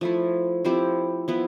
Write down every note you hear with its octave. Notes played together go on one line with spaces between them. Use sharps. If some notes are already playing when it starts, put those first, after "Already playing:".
F3 A3 E4
F3 C4 E4 G4
F3 B3 E4